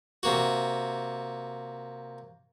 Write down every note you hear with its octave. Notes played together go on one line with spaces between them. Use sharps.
C3 A#3 F#4